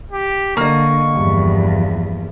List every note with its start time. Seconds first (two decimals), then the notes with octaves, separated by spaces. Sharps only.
0.12 G4
0.57 D3 A#3 D#5 C#6
1.14 E2 G2 F3